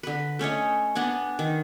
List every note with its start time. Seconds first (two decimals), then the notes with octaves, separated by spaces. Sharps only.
0.03 D3 B4
0.39 A3 C#4 C#5 D#5
0.95 B3 D4 F#5 G#5
1.39 D#3